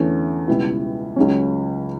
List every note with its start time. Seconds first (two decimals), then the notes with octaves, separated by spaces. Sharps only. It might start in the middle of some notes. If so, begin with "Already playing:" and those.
Already playing: E2 D3 A3 C#4
0.48 C#2 B2 G3 B3 E4
1.16 C#2 C#3 F#3 C#4